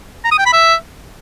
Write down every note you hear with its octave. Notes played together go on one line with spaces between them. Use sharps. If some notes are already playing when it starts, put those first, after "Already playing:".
A#5
D#6
G5
B5
E5